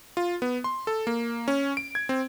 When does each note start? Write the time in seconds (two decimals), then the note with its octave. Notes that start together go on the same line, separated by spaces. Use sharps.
0.17 F4
0.42 B3
0.64 C6
0.87 A4
1.07 A#3
1.48 C#4
1.77 D7
1.95 G#6
2.09 C4